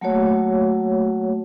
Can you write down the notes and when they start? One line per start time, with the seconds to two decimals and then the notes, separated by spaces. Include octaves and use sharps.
0.01 F#3 A3 A#3 F#4 C#5